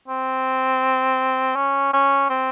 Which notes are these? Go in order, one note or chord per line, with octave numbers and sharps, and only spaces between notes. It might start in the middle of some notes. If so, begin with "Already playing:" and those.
C4
C#4
C#4
C4